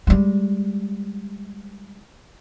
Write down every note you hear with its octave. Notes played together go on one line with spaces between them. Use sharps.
G3 G#3